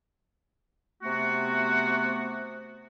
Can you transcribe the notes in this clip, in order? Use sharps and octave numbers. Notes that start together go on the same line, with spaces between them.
C3 A3 B3 F#4